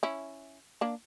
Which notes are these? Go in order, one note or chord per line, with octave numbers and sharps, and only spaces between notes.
C#4 E4
A#3 D4